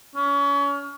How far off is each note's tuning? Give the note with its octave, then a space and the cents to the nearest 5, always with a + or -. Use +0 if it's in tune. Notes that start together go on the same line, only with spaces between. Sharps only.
C#4 +30